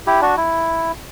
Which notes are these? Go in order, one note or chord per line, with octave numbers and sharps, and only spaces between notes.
E4 G4
D4 F#4
E4